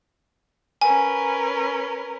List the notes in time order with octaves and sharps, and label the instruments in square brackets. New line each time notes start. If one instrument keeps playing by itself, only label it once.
[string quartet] C#4 A#4 B4 [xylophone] G#5